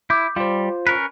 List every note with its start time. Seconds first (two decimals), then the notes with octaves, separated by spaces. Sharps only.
0.10 E4 D6 G6
0.36 G3 F4 C5
0.87 C#4 A#4 B4